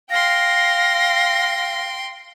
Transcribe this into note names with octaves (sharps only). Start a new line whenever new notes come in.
F5 G5 C6 A#6